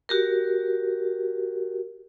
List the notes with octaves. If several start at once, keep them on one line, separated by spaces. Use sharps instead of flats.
F#4 G4 A#4